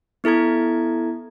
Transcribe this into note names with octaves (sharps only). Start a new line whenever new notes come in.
B3 E4 A4 A#5 G#6